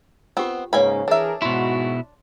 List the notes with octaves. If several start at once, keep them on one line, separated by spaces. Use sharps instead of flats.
B3 C4 F4 G4
G#2 C#3 A#3 B4 C#5 G#5 B5
E3 D4 G#4 A#4 E5
G#2 B2 E4 F#4 C6